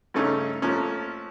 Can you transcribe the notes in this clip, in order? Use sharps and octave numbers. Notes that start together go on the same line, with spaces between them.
G2 C#3 A3 C#4 D#4
F2 F3 A3 A#3 C#4